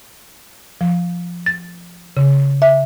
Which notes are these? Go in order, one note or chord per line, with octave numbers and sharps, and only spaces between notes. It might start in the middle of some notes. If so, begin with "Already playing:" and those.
F3
A6
C#3
E5